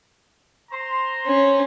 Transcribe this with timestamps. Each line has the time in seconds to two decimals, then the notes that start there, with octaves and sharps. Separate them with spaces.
0.72 C5 A#5 C6
1.26 C#4